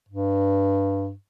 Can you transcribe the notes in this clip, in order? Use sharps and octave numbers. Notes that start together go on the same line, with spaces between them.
G2